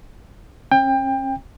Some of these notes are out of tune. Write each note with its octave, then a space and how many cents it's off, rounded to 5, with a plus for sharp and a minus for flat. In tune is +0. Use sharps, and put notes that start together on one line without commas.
C#4 -40 G5 +25